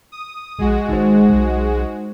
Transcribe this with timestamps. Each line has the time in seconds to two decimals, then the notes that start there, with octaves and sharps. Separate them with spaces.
0.12 D#6
0.59 A#1 G#3 F#4
0.89 G#1 D#4 C5
1.29 B1